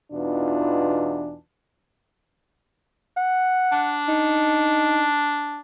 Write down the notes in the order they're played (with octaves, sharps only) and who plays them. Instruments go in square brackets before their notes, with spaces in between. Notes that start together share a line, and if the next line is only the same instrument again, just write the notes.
[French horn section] E2 B2 E3 D4 D#4 F4
[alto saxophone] F#5
[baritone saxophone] D4
[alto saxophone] D#4